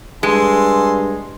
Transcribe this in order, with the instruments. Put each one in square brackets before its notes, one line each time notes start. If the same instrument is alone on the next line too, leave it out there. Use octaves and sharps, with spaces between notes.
[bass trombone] G2 [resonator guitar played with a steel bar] G#3 [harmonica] G#4 A4 C6